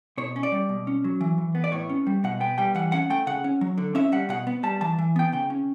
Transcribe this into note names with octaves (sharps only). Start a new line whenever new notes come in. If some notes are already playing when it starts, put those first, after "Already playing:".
B2 C#5
C#4
D5
G3
B2
C#4
F#3
E3
E3
B3
D5
A2 C#5
C#4
G3
B2 F#5
B3 G5
G3 G5
E3 F#5
C#4 F#5
A3 G5
C#3 F#5
C#4
F#3
D3
C#4 E5
G3 F#5
B2 F#5
B3
G3 A5
E3 A5
E3
B3 G5
C#3 G5
C#4